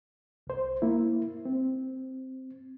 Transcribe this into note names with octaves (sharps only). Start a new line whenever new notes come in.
C2 C5
A#3 E4
C4